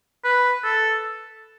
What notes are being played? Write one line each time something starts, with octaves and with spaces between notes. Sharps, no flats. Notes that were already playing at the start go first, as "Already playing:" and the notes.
B4
A4